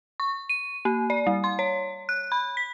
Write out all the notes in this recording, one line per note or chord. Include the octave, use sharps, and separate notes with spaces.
C#6
D#7
A#3
D5
G3
C6
C#5
F#6
B5
B6